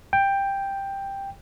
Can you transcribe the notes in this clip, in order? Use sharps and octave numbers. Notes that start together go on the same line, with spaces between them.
G5